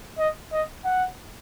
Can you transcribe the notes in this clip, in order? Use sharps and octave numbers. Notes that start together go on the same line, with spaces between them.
D#5
D#5
F#5